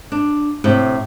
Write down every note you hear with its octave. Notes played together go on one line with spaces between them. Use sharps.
D4
A2 C3